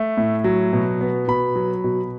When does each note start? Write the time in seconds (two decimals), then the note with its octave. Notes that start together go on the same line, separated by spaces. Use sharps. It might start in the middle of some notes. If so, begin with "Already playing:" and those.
Already playing: A3
0.17 A2
0.44 F#3
0.73 B2
1.01 B3
1.28 B2 B5
1.56 F#3
1.84 B2